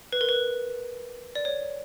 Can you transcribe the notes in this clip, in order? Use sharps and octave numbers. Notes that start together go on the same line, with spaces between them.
B4
A#4
B4
D5
C#5